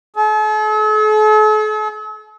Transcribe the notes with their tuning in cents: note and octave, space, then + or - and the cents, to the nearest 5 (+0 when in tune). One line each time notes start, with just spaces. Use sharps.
A4 -45